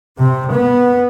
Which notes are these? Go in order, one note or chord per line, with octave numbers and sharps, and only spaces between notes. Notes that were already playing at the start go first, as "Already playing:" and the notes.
C3
B3